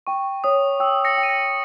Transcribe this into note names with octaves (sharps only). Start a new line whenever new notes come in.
G5 C#6
C#5 D#6
G5 E6
A#6 C#7
G5
D#7
A#6 C#7